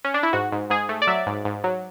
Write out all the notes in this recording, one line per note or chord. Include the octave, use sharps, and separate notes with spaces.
C#4
D4
E4
G#2 F#4
G#2
G#2 G#4
A3
D5
F#3 E5
G#2
G#2
F#3